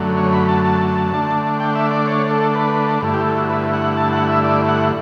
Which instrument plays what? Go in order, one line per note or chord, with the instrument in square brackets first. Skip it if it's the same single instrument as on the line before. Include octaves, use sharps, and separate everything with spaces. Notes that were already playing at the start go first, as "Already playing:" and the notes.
Already playing: [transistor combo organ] F#2 D3 F#3 A3
C#5
B5
A5
A5
A5
D3 A3 D4
G5
E5
D5
C#5
A4
B4
G2 D3 A3 E4
G4
A4
F#4
B4
F#5
A5
F#5
E5
D5
F#5